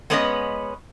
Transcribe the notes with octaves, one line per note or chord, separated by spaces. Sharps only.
G#3 B3 C#4 B4 C#5 D#5